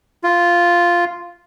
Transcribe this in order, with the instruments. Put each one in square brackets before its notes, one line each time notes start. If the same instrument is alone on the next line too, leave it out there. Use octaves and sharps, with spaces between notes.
[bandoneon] F4